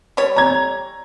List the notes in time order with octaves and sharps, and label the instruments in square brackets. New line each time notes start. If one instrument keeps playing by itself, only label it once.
[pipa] G3 C#5
[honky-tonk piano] A#5 G#6